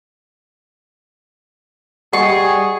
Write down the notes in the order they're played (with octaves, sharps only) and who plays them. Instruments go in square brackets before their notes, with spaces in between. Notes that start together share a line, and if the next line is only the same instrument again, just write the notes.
[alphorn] G3 [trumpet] G#4 [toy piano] D#5 F#5 [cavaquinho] C#6